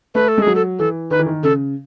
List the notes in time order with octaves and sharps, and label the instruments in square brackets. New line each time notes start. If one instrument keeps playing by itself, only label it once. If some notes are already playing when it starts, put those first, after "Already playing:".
[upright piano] A3 [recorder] B4
[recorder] A4
[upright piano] G#3
[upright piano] F#3 [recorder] G#4
[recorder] A4
[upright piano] E3 [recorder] A4
[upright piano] D#3 [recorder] B4
[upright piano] E3
D#3
[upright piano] C#3 [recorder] A4